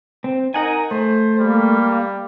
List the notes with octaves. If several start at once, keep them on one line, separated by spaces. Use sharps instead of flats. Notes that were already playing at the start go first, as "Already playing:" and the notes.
C4
D#4 A#4 F#5 G#5
A3 C5
G3 A#3